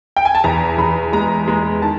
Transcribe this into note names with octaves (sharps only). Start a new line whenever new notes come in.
G5
G#5
A5
E2 A#5
E2 B5
G#3 A#5
G#3
D#3 A5